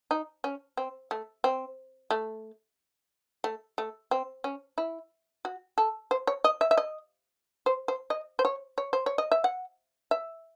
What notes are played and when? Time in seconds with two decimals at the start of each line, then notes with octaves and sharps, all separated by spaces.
0.11 D#4
0.44 C#4
0.77 C4
1.11 A3
1.44 C4
2.11 A3
3.44 A3
3.78 A3
4.11 C4
4.44 C#4
4.78 E4
5.45 F#4
5.78 A4
6.11 C5
6.27 C#5
6.44 D#5
6.61 E5
6.71 E5
6.77 D#5
7.66 C5
7.88 C5
8.10 D#5
8.39 C5
8.45 C#5
8.78 C#5
8.93 C5
9.06 C#5
9.18 D#5
9.32 E5
9.44 F#5
10.11 E5